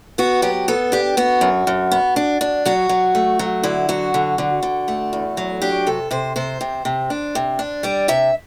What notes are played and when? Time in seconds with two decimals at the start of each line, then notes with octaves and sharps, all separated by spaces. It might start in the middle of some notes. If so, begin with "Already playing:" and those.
0.18 B3 F#4
0.42 F#3 G4
0.68 B3 A4
0.92 D4 G4
1.17 B3 F#4
1.41 F#2
1.67 F#2
1.92 B3
2.16 D4
2.41 D4
2.66 F#3 F#4
2.89 F#3
3.15 A3
3.39 F#3
3.63 D3 E4
3.89 F#3 F#4
4.14 D3
4.38 D3
4.63 D3
4.88 A3
5.13 E2
5.37 F#3
5.62 D4 G4
5.87 C3 A4
6.11 C3 C5
6.36 C3 C5
6.61 C3
6.85 C3
7.10 D4
7.35 C3
7.59 D4
7.83 G3 D5
8.08 C3 E5